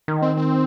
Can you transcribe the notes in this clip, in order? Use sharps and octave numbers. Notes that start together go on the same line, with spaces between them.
D#3
C4
C4